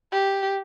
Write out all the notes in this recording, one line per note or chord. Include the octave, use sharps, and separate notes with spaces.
G4